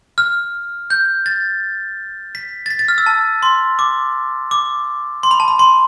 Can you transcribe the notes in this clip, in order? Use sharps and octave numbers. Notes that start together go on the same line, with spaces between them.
F6
G6
A6
B6
A6
B6
A6
F6
E6
A5
C6
D6
D6
C6
B5
A5
B5
C6